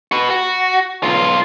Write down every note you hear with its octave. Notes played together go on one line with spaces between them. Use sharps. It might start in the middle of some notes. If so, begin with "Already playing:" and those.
F#4 B4
F#4
B1 F4